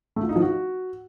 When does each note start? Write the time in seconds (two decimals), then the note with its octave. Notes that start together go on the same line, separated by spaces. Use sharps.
0.16 A3
0.23 F4
0.29 D#4
0.36 F3
0.42 F#4